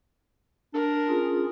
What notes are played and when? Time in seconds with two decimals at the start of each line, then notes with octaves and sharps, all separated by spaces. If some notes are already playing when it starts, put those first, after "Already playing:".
0.74 D4 A#4
1.08 C#4 F4 G#4